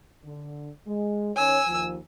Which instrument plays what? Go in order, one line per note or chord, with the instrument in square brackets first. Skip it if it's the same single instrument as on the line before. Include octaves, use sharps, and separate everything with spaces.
[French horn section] D3
G#3
[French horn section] D#3 C#4 C#5 [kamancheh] G#5 E6
[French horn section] D#2 F3